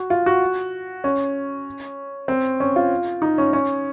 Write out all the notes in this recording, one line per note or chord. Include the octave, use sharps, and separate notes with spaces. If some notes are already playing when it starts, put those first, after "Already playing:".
Already playing: F#4
F4
F#4
C#4
C4
C#4
F4
D#4
C#4
C#4